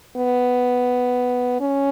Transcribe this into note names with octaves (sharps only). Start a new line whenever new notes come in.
B3
C#4